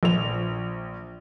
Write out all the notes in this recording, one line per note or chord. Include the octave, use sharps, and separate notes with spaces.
A#1 F3 F7